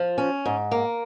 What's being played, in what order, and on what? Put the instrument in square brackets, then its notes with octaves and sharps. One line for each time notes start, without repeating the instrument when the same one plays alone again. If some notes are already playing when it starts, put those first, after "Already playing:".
Already playing: [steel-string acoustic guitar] F3
C#4
G#2
A#3